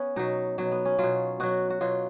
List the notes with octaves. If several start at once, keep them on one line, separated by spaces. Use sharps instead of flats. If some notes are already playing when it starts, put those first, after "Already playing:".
Already playing: B3 C#4
B2 F#3 D#4
B2 F#3
B3
C#4
B2 F#3 F4
B2 F#3 F#4
F#4
B2 F#3 F4